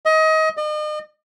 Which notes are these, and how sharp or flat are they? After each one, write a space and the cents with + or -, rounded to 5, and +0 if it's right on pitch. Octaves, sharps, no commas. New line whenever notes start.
D#5 +25
D#5 -40